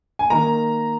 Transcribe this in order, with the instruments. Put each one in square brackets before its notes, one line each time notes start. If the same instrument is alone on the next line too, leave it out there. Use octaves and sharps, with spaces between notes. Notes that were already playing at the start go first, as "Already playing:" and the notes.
[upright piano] G#5
D#3 A#3 A#5